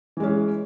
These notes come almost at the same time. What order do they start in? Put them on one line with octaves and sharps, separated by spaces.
E3 G#3 C#4